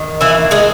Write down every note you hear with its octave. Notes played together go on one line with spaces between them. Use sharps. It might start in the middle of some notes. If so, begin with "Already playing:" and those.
Already playing: D#3
E3 A#3 E4
G#3 G#4